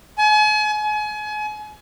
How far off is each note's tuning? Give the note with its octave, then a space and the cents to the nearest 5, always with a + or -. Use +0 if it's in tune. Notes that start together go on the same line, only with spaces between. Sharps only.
G#5 +40
G#5 +35